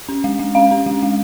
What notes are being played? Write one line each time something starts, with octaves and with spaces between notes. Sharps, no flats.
C#4
G#3
G#3
C#4 F5
C#4
G#3
G#3